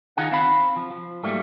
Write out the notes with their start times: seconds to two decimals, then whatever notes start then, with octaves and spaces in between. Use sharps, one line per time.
0.17 D#3 D#4 F4 G#4 F#5
0.32 C4 F5 B5
0.76 F3
0.91 F3
1.23 G#2 F#3 G3 A3 A#3